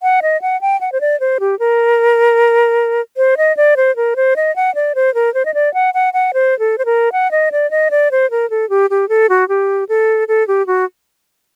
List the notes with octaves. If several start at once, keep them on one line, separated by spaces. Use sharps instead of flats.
F#5
D#5
F#5
G5
F#5
C5
D5
C5
G4
A#4
C5
D#5
D5
C5
A#4
C5
D#5
F#5
D5
C5
A#4
C5
D#5
D5
F#5
F#5
F#5
C5
A4
C5
A#4
F#5
D#5
D5
D#5
D5
C5
A#4
A4
G4
G4
A4
F#4
G4
A4
A4
G4
F#4